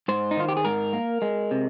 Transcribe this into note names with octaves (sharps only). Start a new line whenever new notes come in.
G#2 C5
D#4
D#3 F4
G4
G#4
G#2 A#4
A#3
G#3
C3